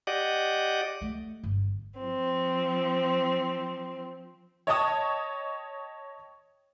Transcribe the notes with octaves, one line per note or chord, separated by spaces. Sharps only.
G4 D5 D#5 F#5
A3
G1
F3 C4
C#5 D#5 G5 A5 C#6 D#6